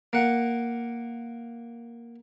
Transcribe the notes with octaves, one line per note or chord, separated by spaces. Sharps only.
A#3 F#5